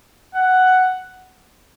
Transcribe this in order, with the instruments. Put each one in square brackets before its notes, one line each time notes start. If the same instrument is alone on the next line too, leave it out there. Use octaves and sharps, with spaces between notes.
[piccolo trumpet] F#5